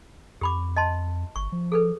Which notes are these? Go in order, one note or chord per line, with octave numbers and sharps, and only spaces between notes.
F2 G4 B5 D6
D#5 A5 C6
G1 C#6
F3
G#4 A4 B4